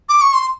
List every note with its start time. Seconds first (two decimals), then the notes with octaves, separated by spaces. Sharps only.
0.09 D6
0.21 C#6
0.33 C6